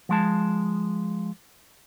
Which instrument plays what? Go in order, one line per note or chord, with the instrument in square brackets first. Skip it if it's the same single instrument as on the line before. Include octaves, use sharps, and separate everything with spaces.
[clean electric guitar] F3 G#3 A5